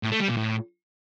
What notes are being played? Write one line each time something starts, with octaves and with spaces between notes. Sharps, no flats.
A2
A3
G3
A#2
A2